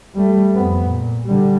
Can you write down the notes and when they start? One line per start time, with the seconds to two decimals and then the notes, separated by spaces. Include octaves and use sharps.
0.15 G3 A3
0.55 F2 B3
0.89 A#2
1.26 D3 G3